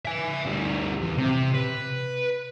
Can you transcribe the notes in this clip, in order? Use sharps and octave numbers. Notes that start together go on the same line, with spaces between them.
E5 G#5
D2 G3
E2
C3
B4